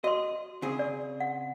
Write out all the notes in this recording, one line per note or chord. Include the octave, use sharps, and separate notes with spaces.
F#4 D#5 C6
C#3 C4 G#4
D5
F#5